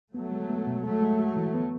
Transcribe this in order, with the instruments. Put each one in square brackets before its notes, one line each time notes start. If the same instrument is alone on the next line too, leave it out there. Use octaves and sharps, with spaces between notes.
[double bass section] F#3 A3 [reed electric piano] B3
[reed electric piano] G#3
B3
B2
[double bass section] F#3 A3 [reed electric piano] G#3
[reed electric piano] G#3
F#4
E3
B3